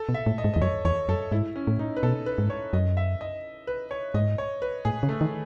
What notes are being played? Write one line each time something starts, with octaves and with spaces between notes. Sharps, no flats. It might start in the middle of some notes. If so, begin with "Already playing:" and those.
Already playing: A4
B2
E5
A2
D#5
G#2
D#5
E2
F#2 C#5
E2 C#5
F#2 A4
G#2 E4
C#4
A2
D#4
B4
B2 A4
B4
G#2
C#5
F#2 D#5
E5
D#5
B4
C#5
G#2 D#5
C#5
B4
A2 G#4
C#3
A3
D#3